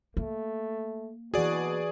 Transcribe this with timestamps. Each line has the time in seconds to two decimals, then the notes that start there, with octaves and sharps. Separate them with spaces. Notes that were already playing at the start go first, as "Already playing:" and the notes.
0.17 A3 A#3
1.34 B2 E3 F#4 G#4 D5